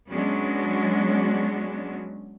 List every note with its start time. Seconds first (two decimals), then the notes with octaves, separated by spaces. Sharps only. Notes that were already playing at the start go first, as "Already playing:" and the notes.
0.11 F#3 G#3 B3 C#4 D4 F#4